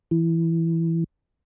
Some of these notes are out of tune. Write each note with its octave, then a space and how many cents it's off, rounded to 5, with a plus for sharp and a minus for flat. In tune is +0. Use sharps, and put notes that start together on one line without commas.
E3 +5